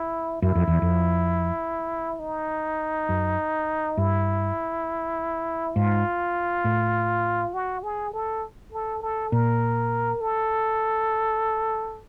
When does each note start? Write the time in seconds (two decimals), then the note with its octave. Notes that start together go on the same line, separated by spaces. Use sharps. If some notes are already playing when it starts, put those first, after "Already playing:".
Already playing: E4
0.42 F#2 E4
0.55 F2
0.68 E2
0.82 F2
2.20 D#4
3.09 F#2
3.97 G2 E4
5.76 G#2 F4
6.64 A2
7.54 F#4
7.83 G#4
8.13 A4
8.72 A4
9.02 A4
9.32 A#2 A#4
10.21 A4